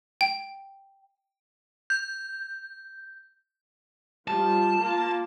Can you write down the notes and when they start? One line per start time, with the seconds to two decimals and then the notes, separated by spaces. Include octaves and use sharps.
0.21 G5
1.90 G6
4.28 F3 G3 F4 A5
4.80 A#3 F4